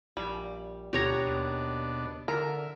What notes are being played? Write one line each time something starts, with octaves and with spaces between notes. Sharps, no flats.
A#1 G3
D2 B2 D4 G4 C#5 A#5
D#2
D3 A#4 E5